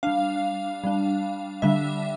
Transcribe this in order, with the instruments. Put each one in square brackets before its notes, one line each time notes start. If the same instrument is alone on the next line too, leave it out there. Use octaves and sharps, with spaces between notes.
[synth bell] G3 D4 F5
G3 D4
D3 G3 D4 E5